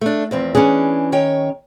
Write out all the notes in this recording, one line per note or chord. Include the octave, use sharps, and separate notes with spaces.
A3 D4
E2 F3 C4
E3 C#4 D4 G#4
D#3 C#5 G5